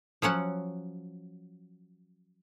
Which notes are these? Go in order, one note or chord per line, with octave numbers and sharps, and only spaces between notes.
F3 F#3 C#4 F#5